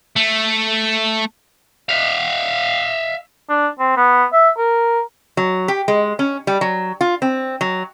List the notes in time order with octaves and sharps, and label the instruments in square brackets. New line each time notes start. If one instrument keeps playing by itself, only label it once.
[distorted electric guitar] A3
E5 F5
[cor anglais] D4
C4
B3
E5
A#4
[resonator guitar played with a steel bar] F#3
G4
G#3
C#4
G3
F#3
F4
C4
F#3